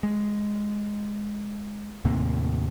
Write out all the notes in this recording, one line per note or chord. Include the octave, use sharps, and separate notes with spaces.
G#3
D#2 A2 C3 A#3